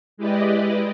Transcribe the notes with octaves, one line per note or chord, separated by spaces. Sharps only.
G#3 E4 G4 B4 D5 D#5